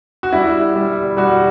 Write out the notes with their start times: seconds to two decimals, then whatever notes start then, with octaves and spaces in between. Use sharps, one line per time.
0.23 F#4
0.33 G3 E4
0.75 G3
1.17 G3 F#4